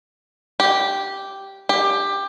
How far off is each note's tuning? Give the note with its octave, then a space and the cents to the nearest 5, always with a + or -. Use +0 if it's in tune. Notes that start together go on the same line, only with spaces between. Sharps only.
G4 -5
G4 +15